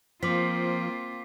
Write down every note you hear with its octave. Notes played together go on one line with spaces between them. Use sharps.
F3 A#3 C4 F4 D6 B6